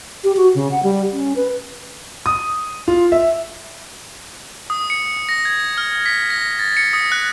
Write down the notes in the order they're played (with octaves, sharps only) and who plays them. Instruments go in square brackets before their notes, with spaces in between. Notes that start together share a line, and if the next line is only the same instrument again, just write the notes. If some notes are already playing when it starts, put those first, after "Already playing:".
[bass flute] G4
F#4
C#3
F#5
G3
C#4
B4
[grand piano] D#6
F4
E5
[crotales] D#6
C#7
A#6
G#6
F6
B6
A#6
A6
C#7
D#6
F#6